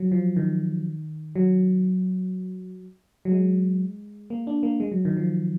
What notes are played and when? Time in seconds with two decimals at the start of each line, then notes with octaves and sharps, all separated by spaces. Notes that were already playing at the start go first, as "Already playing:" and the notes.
Already playing: F#3
0.12 F3
0.36 D#3
1.35 F#3
3.25 F#3
3.32 G#3
4.30 A#3
4.47 D4
4.63 A#3
4.80 G#3
4.92 F#3
5.05 D#3
5.17 F3